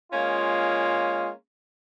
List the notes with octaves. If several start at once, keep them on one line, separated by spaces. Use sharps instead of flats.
G#3 A#3 C#4 F4